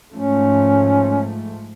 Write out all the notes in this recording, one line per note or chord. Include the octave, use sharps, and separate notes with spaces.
G#2 F3 A3 C#4